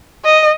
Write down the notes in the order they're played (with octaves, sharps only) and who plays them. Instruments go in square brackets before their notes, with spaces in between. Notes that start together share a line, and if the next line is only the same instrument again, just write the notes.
[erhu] D#5